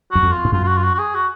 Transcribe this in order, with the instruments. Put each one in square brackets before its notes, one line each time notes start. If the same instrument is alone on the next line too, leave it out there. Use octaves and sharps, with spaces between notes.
[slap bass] F#2 [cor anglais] F#4
[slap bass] F2
[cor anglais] F4
[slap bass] G#2
[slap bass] F#2 [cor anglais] F4
[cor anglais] F4
F#4
F4
F#4
F#4
G#4
F#4